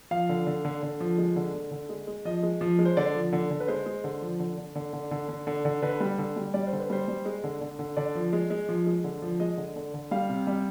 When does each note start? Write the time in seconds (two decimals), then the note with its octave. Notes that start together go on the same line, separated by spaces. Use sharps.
0.11 F3 F5
0.29 D3
0.47 D3
0.65 D3
0.83 D3
1.00 F3
1.18 G#3
1.36 D3
1.54 D3
1.71 D3
1.89 G#3
2.07 G#3
2.25 F3 D#5
2.43 G#3
2.61 F3
2.79 G#3
2.85 C5
2.97 D3 D5
3.15 F3
3.33 D3
3.51 D3
3.60 B4
3.68 G#3 C5
3.86 G#3
4.04 D3
4.22 F3
4.40 D3
4.57 D3
4.75 D3
4.93 D3
5.11 D3
5.28 D3
5.47 D3
5.65 D3
5.82 D3 B4
6.00 G3
6.18 D3
6.36 G3
6.54 G3 D5
6.67 C5
6.73 D3
6.80 B4
6.90 G3 C5
7.08 G3
7.25 G#3
7.44 D3
7.61 D3
7.79 D3
7.97 D3 D5
8.15 F3
8.33 G#3
8.50 G#3
8.69 F3
8.87 G#3
9.04 D3
9.22 F3
9.40 G#3 D#5
9.57 D3
9.76 D3
9.94 D3
10.11 G3 F5
10.29 C3
10.47 G3